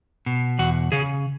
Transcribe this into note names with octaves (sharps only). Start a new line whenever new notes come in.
B2
E2 F#4
C#3 G#4